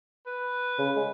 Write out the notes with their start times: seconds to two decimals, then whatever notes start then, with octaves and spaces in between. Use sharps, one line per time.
0.26 B4
0.78 C#3
0.96 G#3